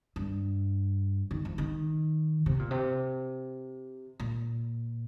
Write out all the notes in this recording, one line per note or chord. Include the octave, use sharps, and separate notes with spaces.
G2
D#3
F3
D#3
C3
A#2
C3
A#2